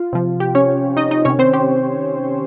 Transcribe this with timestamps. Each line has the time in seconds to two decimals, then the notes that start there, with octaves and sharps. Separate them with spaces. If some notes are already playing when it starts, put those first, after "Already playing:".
Already playing: F4
0.13 C3 F3
0.40 G4
0.55 C#4 C#5
0.97 D#4 D#5
1.11 D#4 D#5
1.25 C3 D#3 C#4 C#5
1.39 C4 C5
1.53 G4